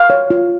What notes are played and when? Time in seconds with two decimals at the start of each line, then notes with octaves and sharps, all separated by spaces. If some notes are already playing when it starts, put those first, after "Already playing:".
Already playing: F5
0.10 C#5
0.30 F4